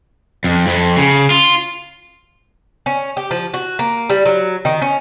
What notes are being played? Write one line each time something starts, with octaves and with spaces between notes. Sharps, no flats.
F2
F2
C#3
F4
C#4
G4
F3
F#4
A#3
G3
F#3
D#3
C#4